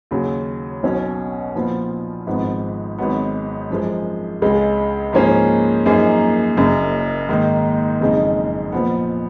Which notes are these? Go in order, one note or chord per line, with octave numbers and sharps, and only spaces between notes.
D#2 C#3 F#3
B1 B2 F#3 C#4
A#2 F3 B3 F4
G#1 G#2 F3 B3
G#1 G#2 F#3 B3
F#2 F3 G#3
C#2 C#3 G#3
G#2 F3 A#3 C#4 G#4
F#2 F3 A#3 D#4 G#4
F#1 F#2 C#3
G#2 D#3 A#3 D#4
F#1 F2 C#3 G#3 D#4
A#2 F3 B3